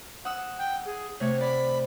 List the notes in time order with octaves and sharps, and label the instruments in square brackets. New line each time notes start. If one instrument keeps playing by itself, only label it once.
[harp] F#5 D#6 E6
[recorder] G5
G#4
[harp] C3 A3 [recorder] C#5
[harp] D5 [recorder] B5